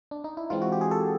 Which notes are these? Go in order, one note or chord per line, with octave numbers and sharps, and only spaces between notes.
D4
D#4
E4
E3 G#3 C4 F4
F#4
G4
G#4
A4